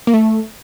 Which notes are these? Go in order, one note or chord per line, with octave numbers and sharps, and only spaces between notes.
A#3
A3